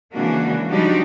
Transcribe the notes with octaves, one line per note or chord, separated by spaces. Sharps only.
C#3 E3 G#3 A#3 D4 F#4
F3 G3 D4 D#4 F#4 G4